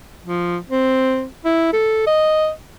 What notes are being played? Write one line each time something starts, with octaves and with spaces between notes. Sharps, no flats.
F3
C4
E4
A4
D#5